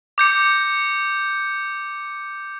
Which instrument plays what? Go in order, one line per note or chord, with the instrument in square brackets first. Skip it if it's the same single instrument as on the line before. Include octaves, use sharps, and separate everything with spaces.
[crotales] D6 G6 C#7